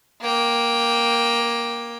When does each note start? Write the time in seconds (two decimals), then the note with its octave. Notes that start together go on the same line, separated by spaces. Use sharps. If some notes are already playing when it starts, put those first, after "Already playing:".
0.21 A#3 G5